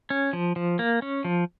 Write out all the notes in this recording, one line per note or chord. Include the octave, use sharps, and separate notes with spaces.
C#4
F3
F3
A#3
C#4
F3